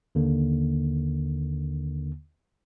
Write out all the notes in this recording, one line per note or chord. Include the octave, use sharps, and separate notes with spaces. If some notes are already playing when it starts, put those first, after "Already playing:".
D#2 D3 A#3